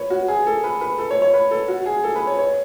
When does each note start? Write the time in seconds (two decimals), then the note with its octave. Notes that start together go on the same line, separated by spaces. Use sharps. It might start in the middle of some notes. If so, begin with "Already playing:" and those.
Already playing: B4 C#5
0.10 F#4
0.28 G#4
0.47 A4
0.64 B4
0.81 B4
0.98 A4
1.11 C#5
1.22 C#5
1.34 B4
1.51 A4
1.68 F#4
1.86 G#4
2.04 A4
2.16 B4
2.27 C#5
2.39 C#5